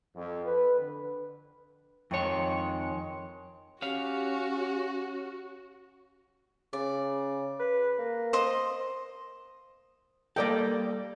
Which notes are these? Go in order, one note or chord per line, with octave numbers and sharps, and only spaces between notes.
F2
B4
D3
F2 D#3 G#3 C#5
C#4 F#4 G4 C#5 F5
C#3 D5
B4
A#3
C5 D#5 D#6
G3 A#3 A4 D5 D#5 G5